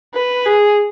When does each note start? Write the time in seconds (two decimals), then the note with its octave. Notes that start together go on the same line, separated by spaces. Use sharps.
0.15 B4
0.46 G#4